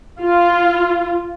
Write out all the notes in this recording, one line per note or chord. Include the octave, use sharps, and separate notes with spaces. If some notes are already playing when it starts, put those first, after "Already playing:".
F4